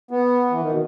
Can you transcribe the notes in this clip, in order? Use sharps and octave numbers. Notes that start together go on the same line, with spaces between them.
B3
E3
D#3
B2